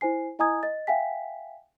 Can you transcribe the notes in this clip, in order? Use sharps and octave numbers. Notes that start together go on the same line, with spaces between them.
E4 C5 G#5 C7
E4 D#5 G#5 A#5 D#6 G#6
D#5 A6
E5 F5 G5 G#5 B6